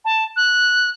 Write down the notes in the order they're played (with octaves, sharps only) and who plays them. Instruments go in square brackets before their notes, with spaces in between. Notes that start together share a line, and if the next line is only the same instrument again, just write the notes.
[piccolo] A5
F#6